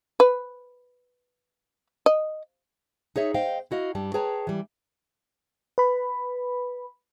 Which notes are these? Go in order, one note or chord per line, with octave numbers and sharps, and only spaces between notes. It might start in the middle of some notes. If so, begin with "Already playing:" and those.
B4
D#5
D#4 G#4 C#5 E5
C5 D#5 F5 G5
E4 F#4 D#5 F5
G2 G3 A5
G#4 B4 C#5 G5 A5 A#5
E3 G3
B4 B5